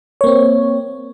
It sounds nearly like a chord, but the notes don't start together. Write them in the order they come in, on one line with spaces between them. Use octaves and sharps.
C#5 A#3 C4